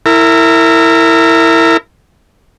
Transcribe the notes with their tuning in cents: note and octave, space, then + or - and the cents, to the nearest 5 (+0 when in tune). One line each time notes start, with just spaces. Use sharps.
E4 +0 A#4 -30